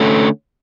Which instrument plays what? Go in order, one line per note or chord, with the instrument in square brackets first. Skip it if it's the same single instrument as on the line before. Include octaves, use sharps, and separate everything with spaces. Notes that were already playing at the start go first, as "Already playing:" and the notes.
Already playing: [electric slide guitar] D3 A3 C#4